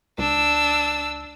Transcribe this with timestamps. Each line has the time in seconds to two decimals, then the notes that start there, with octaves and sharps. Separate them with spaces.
0.18 C#2 D4 E6